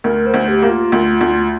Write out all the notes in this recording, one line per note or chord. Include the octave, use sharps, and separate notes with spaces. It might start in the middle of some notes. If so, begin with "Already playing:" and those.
D2 A#4
C5
D2
G4
A#3
F4
D2
D2